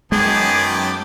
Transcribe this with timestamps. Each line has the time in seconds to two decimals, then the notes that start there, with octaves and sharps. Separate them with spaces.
0.12 F#2 D#3 G#3 B3 G#4 G5 A5 D6